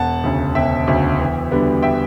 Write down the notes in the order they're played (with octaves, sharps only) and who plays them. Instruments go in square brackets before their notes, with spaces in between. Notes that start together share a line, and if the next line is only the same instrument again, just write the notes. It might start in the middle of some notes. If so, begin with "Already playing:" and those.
Already playing: [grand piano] E1 F#5 A5
D2 C#3
E1 E5 G5
D2 C#3
E2
D3 G3 B3
E5 G5